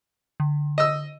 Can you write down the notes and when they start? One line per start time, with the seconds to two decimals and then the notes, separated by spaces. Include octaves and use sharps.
0.40 D3
0.78 D#5 E6